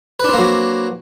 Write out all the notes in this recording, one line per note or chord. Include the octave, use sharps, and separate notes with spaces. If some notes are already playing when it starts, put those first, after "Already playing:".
F#3 A#3 C4 D4 B4